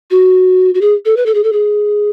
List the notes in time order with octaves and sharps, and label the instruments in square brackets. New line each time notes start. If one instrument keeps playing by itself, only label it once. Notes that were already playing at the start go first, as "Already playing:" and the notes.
[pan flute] F#4
F#4
G#4
A4
B4
A4
G#4
A4
G#4